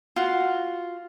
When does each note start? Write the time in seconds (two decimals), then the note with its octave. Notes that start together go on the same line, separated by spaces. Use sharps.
0.16 F4 F#4